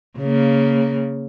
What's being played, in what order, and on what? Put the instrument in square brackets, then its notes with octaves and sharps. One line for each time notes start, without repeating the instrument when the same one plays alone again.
[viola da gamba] C#3 A#3